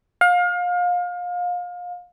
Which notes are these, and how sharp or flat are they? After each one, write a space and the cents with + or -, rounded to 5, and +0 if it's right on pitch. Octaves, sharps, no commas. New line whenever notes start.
F5 +30